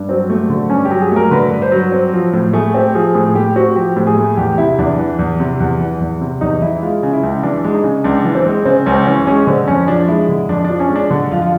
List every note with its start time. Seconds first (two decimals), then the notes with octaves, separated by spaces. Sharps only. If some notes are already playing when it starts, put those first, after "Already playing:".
Already playing: G2
0.09 F#3 C4
0.30 A3
0.50 D3
0.70 G2 C#4
0.85 G4
0.91 F#3
1.01 G#4
1.12 A3 A#4
1.31 D3 B4
1.51 G2
1.62 C5
1.72 F#3
1.92 C4
2.13 F3
2.33 A2
2.53 A3 G#4
2.74 C4 G4
2.95 F3 G#4
3.15 A2 G#4
3.35 A3 G4
3.56 C4 F#4
3.76 F3 G4
3.96 A2
4.07 G#4
4.16 A3
4.37 E2 G4
4.58 C3 E4
4.78 E2 D4
4.98 E3
5.19 E2
5.40 C3
5.60 E2
5.80 E3
6.00 E2
6.21 C3
6.41 E2 D#4
6.62 E3 E4
6.82 G#3 F4
7.03 C#3
7.13 E4
7.23 C#2
7.43 E3 D4
7.64 G#3
7.74 D#4
7.84 C#3
8.04 C#2 D4
8.25 E3
8.35 C4
8.46 G#3
8.65 C#3 C4
8.86 C#2 C#4
9.07 E3 C#4
9.27 G#3 C#4
9.47 D3 C4
9.68 F2 C#4
9.88 F3 D4
10.08 G#3 E4
10.29 D3
10.49 F2 D4
10.64 F3 D4
10.80 C#4
10.90 G#3
10.96 D4
11.10 D3
11.31 F2 F4
11.42 F4